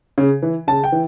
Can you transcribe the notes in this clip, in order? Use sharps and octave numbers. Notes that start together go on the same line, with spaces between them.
C#3
E3
C#3 A5
G5
E3